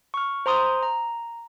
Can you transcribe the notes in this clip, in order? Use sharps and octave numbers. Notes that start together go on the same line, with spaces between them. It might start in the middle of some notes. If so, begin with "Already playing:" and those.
C#6 F6
C5 A#5 C6 D#6
A#5